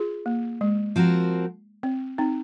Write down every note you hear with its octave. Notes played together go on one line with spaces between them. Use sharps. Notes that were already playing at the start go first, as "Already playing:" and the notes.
Already playing: F4 G#4
A#3
G#3
F3 C4 F#4 A#4
C4
C4 D#4